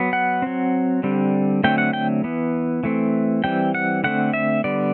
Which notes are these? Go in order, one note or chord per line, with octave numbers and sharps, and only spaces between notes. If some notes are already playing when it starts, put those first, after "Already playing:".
Already playing: F#3 B3
F#5
F#3 C4
D3 G3 C4
D3 F#3 A3 C4 G5
F#5
G5
E3 B3
E3 A3 C4
E3 G3 C4 G5
F#5
D3 A3 C4 F#5
E5
D3 G3 B3 D5